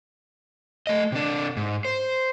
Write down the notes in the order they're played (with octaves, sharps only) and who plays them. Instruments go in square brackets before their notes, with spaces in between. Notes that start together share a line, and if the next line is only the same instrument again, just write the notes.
[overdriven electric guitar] A3 D#5
C3 D4
G#2
C5